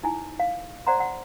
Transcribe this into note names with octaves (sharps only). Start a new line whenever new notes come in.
D#4 E4 G#5
F5
C5 D5 F#5 A#5 C6
F#5